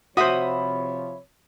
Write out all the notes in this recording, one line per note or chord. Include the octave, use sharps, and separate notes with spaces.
C3 F3 F#4 C5 C#5 E5 B5 D#6